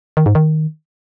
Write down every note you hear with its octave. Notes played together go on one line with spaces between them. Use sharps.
D#3
G#2
D#3